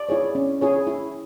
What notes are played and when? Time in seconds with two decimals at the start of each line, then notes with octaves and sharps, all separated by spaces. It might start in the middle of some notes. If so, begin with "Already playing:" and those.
Already playing: D5
0.09 E4 G#4 C#5
0.35 C#4
0.61 E4 G#4 C#5
0.87 E4